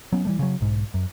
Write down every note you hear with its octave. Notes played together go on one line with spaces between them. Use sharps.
F#3 B3 C#4
E3 G3 A3
C#3 F#3
B1 G#2
F#2